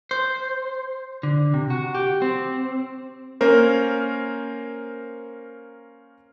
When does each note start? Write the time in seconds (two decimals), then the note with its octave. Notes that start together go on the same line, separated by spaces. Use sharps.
0.11 C5
1.23 D3
1.54 C3
1.70 F#4
1.95 G4
2.22 C4
3.41 A#3 C#4 A#4 C5